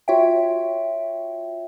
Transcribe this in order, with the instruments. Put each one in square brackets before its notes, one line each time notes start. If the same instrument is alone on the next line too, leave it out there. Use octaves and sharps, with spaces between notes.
[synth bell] F4 F#4 C#5 E5 G5